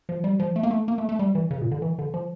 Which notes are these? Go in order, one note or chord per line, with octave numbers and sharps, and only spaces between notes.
F3
G3
F3
A3
A#3
A3
A#3
A3
A3
G3
E3
C#3
A#2
D3
E3
D3
F3